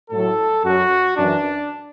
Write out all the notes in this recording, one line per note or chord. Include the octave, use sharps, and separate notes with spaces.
A2 F#3 A4
F#2 F#3 F#4
F#2 E3 D4